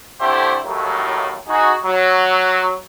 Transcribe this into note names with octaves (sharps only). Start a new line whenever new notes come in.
D3 A3 C4 E4 G4 C5
D#2 A2 F#3
D#4 F#4 G#4
F#3